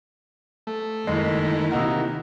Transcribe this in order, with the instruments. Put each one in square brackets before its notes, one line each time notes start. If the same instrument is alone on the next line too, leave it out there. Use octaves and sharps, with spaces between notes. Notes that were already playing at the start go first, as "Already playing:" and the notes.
[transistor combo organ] A3
[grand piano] F#1 G#3 [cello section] D#3 E4
[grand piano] C3 D#4 F#4 [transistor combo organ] A#3